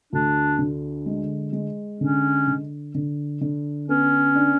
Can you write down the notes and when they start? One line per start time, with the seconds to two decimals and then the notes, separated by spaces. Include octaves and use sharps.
0.13 D2 D4
0.59 D3
1.06 G#3
1.53 G#3
2.00 D3 C#4
2.48 D3
2.95 D3
3.41 D3
3.88 B3 C#4
4.35 D4